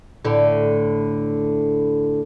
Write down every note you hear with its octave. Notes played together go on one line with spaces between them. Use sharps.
A2 D3